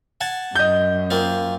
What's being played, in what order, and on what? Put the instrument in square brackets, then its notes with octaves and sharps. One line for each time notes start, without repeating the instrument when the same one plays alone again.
[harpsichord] F#5 G#5 A5
[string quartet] F#2 [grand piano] D#5 G6
[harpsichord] A#3 C4 F4